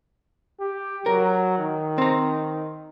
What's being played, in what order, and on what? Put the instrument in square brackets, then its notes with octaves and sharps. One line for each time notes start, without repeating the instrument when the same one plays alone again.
[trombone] G4
[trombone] F#3 [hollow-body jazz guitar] A#4
[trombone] D#3
[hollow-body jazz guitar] C4 A#5